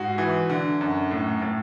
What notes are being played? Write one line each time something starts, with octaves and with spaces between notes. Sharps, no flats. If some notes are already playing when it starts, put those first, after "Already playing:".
Already playing: G#2 F#4
E3
D3
F#2
A2
A2